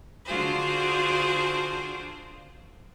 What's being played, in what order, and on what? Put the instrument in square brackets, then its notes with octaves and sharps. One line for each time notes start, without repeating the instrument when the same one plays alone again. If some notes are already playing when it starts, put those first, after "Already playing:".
[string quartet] D3 D4 F4 F#4 G#4 C5